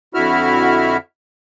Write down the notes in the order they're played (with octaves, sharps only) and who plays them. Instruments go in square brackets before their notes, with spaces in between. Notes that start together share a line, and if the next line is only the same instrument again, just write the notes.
[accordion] F2 D3 E4 F#4 E5 F6